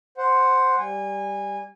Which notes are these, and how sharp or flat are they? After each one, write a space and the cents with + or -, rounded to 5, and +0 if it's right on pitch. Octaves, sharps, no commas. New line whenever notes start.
C5 +0 F#5 +0
G3 +0 G#5 -25